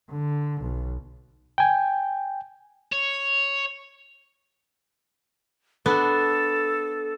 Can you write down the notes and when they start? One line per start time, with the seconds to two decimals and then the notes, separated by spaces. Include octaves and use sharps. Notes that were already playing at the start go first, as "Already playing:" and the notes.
0.10 D3
0.61 B1
1.58 G5 G#5
2.92 C#5
5.86 B3 D4 A4